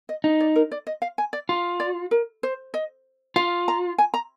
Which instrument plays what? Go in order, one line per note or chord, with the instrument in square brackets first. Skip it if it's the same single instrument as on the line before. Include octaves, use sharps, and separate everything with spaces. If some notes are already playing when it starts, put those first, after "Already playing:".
[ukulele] D#5
[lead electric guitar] D#4
[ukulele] D5
A#4
D5
D#5
F5
G#5
D5
[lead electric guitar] F4
[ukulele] D5
A#4
C5
D#5
[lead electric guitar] F4 [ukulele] F5
[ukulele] A#5
G#5
A#5